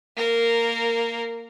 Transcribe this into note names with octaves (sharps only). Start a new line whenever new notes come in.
A#3 A#4